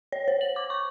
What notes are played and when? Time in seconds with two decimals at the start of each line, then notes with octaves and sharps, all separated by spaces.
0.12 C#5
0.28 C5
0.41 F#7
0.56 D6
0.70 C#6